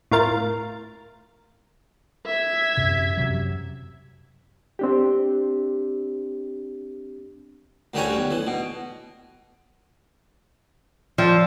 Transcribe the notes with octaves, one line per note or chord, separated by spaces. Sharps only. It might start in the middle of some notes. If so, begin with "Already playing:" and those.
A2 F4 A#4 A6
E5 G#6
F#2 C3
F#2 C3 F#3
C4 D4 G4
D2 D3 G3 C#4 F#4 G#5
B1
E3
B2
F3 D5 G5 E6